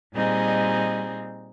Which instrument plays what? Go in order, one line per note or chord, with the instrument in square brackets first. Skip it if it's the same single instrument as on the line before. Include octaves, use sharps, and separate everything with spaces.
[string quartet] A#2 G3 C4 D#4 G#4 D#5